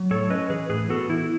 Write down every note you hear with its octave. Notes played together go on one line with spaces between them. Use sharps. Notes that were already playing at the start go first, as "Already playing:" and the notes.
Already playing: F#3
A2 A4 C#5
C#4 B4 D#5
E3 G#4 B4
A2 G#4 B4
B3 F#4 A4
E3 E4